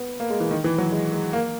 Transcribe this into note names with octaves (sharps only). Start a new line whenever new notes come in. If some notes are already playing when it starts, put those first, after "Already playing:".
Already playing: B3
A#3
G#3
E3
D#3
E3
F#3
G#3
G#3
A#3